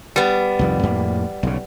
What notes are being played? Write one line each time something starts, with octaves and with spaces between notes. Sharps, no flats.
G3 B3
C2 F2 D#3
F2 A2 A#3
B1 C#3